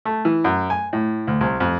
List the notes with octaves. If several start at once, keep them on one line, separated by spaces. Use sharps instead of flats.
A3
E3
F#2
G#5
A2
D2
C2
F2